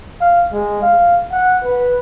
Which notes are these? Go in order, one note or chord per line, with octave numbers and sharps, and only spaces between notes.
F5
G#3
F5
F#5
B4